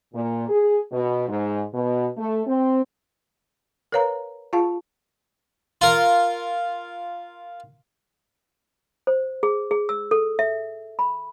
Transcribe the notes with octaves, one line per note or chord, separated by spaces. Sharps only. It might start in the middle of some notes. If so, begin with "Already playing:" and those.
A#2
G#4
B2
G#2
B2
A3
C4
A#4 B4 C#5 F5 A#5
F4 G#4 F5 A5
F4 A#4
C5
G#4
G#4
E6
A4
E5
B5